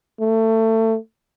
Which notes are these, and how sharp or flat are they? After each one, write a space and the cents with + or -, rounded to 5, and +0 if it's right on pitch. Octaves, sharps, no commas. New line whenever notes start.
A3 +25